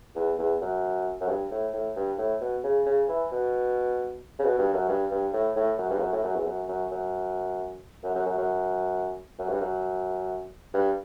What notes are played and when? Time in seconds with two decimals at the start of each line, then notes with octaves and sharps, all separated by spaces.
0.15 E2
0.38 E2
0.61 F#2
1.21 F#2
1.28 G2
1.51 A2
1.73 A2
1.96 G2
2.18 A2
2.41 B2
2.64 C#3
2.86 C#3
3.08 E3
3.31 B2
4.39 C#3
4.44 B2
4.58 G2
4.74 F#2
4.88 G2
5.11 G2
5.33 A2
5.56 A2
5.78 F#2
5.90 G2
5.97 E2
6.01 F#2
6.12 A2
6.24 F#2
6.36 E2
6.46 F#2
6.68 F#2
6.91 F#2
8.04 F#2
8.15 F#2
8.26 F#2
8.38 F#2
9.39 F#2
9.49 G2
9.60 F#2
10.74 G2